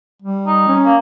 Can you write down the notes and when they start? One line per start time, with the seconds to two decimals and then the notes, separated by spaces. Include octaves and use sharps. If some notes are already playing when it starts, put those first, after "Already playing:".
0.22 G3
0.47 D#4
0.68 C#4
0.85 A#3